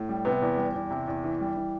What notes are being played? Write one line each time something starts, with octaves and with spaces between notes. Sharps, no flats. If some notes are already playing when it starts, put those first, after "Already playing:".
Already playing: A2
G3
C3 B3
E2
G3
E2
C3
E2
E3
G3
E3